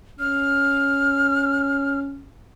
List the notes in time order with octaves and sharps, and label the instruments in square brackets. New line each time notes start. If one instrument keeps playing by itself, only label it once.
[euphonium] C#4 [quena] F6